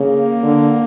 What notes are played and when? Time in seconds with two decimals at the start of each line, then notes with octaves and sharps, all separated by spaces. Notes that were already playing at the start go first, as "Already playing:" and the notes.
Already playing: C#3 A#3
0.43 D3